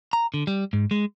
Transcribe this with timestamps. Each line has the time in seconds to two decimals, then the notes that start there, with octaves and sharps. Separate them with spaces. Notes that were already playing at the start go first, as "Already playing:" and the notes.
0.13 A#5
0.34 D3
0.47 G3
0.73 G#2
0.91 G#3